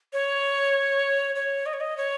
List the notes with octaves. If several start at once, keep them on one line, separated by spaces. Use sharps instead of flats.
C#5
C#5
D#5
C#5
D#5
C#5